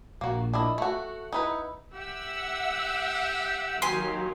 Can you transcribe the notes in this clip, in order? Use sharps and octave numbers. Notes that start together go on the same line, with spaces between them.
A#1 A#2 A#3 F#4
D4 E4 D#5
A3 F#4 F#5
D#4 E4 B4
G4 E5 F#5 E6
D#3 F#3 A#3 G#5 C6